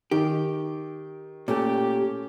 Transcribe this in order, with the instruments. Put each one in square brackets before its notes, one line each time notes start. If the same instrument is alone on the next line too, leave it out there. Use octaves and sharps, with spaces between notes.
[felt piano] D#3 [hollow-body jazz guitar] G4
[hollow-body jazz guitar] A#2 [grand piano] A3 C#4 [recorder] G4